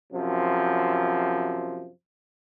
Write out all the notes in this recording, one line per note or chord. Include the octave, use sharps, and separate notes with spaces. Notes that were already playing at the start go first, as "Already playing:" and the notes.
F#2 C3 F3